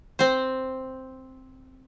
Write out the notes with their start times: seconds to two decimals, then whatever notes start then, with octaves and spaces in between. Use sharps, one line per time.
0.19 C4 C5